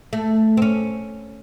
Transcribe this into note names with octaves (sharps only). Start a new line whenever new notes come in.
A3
C4
C#4